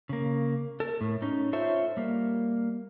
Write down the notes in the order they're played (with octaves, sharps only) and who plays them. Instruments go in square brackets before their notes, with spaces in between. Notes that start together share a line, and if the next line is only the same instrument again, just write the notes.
[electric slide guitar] C#3 A#3
A4 A#4
A2
C#4 D#4
F4 A4 C5 C#5 E5
G3 A#3